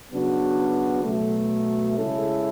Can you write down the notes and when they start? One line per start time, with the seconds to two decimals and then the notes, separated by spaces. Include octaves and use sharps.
0.12 C#3 F#3 B3 D4 F#4
1.04 B2 F#3 A3
1.96 C#3 G#3 C#4 E4 A4